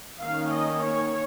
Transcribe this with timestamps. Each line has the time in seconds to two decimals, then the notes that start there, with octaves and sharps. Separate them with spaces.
0.21 D#3 A#3 C#4 F5
0.52 D#5
0.82 C#5